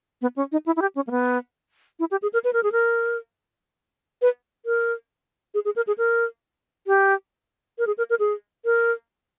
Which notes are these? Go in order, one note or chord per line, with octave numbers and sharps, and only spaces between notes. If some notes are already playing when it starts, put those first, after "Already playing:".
B3
C#4
D#4
E4
E4
G4
C#4
A#3
B3
E4
G4
G#4
A#4
B4
A#4
G#4
A#4
B4
A#4
G#4
G#4
A#4
G#4
A#4
G4
A#4
G#4
A#4
A#4
G#4
A#4